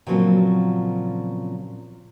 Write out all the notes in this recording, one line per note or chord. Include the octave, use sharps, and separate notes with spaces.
A#2 C#3 F3 F#3 B3 C4